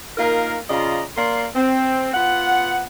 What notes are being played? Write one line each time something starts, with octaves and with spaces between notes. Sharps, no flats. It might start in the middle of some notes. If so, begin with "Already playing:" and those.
A#3 D#4 F4 A#4
C#3 F4 D5 D#5 A#5
A#3 A#4 D5 C6
C4
B3 F4 F#5